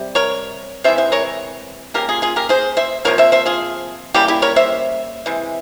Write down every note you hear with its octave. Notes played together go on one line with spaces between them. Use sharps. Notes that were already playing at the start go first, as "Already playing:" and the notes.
Already playing: C3 G3
A#4 C#5
C3 E3 G#3 C5 E5
C5 E5
A#4 C#5
G3 A#3 G4 A#4
C#3
F4 G#4
F4 G#4
G4 A#4
G#4 C5
C5 E5
C3 F3 A#3 A#4 C#5
C5 E5
C5 E5
F4 G#4
C#3 G3 A#3 E4 G4
E4 G4
A#4 C#5
C5 E5
C3 E3 G#3